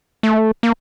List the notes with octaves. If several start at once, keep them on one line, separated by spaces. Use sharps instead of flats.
A3
A#3